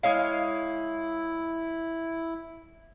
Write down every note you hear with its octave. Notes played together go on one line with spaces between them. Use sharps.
G#3 E4 C#5 F5